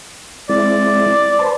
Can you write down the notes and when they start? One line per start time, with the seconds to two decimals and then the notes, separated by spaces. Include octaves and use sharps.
0.50 G#3 C4 E4 D5
1.39 B4 C5 A5